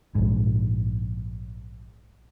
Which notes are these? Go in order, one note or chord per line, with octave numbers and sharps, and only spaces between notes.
A#1 G#2